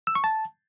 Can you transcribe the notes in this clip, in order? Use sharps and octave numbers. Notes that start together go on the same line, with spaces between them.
E6
C#6
A5